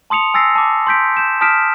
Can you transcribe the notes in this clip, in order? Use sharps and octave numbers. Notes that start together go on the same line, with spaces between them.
A5 C6 D#6 C#7 F7
G#5 E6 A6 A#6 C7
A5 D6
C6 E6 G6 B6 D7
G6 E7
A5 D#6 F6 B6 D7 E7